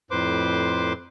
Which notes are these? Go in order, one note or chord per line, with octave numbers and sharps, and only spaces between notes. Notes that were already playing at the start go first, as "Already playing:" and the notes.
F2 A2 B4 C5 C6 D6